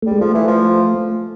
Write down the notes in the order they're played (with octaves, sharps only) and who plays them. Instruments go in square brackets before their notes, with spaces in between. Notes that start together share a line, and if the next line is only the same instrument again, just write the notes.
[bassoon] G3 [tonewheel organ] A3
[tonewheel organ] G#3
[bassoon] F3 [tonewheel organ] A3
[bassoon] E3
F3